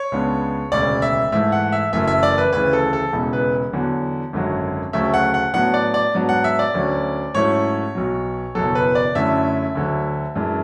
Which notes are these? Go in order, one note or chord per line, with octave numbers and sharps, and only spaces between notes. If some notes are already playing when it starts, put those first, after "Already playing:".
Already playing: C#5
C#2 C#3 G#3 B3 D4
E1 D2 C#3 D5
E5
G#2 E3 A3 E5
F#5
E5
F#1 F#2 E3 A3 E5
E5
D5
B4
D2 C#3 E3 B4
A4
A4
E1 E2 C#3
B4
E2 D3 F#3
G#1 F#2 D3 F#3
D2 C#3 F#3 A3 E5
F#5
F#5
A2 F#3 B3 D4 F#5
D5
D5
G#2 F#3 B3 D4
F#5
E5
D5
D2 D3 F#3 C#4
G#2 F#3 A3 C#4 E4 C#5
B1 B2 F#3
F#1 E2 B2 F#3 A4
B4
D5
F#2 D3 A3 C#4 E4 E5
D2 D3 F#3
F#2 E3 G#3 D4